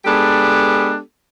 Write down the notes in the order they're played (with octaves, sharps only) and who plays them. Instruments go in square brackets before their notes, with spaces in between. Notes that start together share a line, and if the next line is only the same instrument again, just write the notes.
[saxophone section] G#3 B3 D4 G4 A4